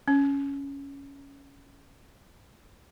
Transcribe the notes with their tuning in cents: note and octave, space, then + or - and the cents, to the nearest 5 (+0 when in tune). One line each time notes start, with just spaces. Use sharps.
C#4 +5